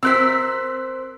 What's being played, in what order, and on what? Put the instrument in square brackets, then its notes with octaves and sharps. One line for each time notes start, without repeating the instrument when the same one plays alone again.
[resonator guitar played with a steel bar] C4 A#4 C5 [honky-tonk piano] E6 F#6 B6